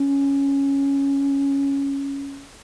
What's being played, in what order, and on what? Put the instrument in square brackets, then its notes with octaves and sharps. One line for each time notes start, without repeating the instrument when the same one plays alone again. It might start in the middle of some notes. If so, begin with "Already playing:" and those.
Already playing: [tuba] C#4